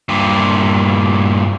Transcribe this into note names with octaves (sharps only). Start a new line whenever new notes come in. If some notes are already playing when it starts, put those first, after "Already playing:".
G2 A#2